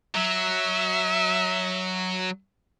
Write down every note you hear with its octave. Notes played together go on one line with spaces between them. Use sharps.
F#3 E5